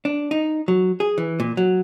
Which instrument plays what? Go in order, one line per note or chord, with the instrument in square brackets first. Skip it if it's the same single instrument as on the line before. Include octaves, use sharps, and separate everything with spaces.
[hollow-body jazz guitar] D4
D#4
F#3
G#4
E3
A#2
F#3